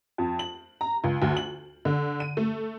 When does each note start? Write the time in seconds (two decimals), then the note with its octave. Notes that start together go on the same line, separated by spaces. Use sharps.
0.18 F2
0.39 F#7
0.81 A#5
1.04 C#2
1.22 D2
1.37 F#7
1.85 D3
2.20 D#7
2.37 A3